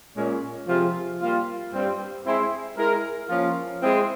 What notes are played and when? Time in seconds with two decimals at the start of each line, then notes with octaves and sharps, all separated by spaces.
0.15 A#2 G#3 C#4
0.67 C3 F3 C4 F4 G#4
1.20 G3 A#3 F4
1.72 G2 G3 C4
2.24 G#3 C4 E4 G#4 C5
2.76 G#3 E4 A#4
3.29 F3 A#3 C#4 F4
3.81 G#3 C4 E4 G#4 C5